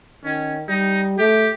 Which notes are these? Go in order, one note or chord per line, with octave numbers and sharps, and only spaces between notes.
D#3 C#4
G3 D#4
A3 G4